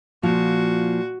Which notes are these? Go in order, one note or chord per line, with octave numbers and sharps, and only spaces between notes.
A#2 F3 F#4